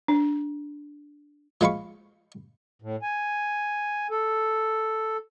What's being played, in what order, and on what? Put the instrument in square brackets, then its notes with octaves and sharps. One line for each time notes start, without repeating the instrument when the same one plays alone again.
[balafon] D4
[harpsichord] F3 G#3 F5 B5 C#6
[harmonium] A2
G#5
A4